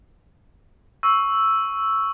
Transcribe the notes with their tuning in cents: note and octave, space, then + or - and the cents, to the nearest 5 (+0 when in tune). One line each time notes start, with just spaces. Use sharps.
C#6 +5 E6 +0